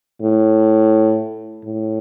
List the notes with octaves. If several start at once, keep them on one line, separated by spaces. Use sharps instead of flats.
A2
A2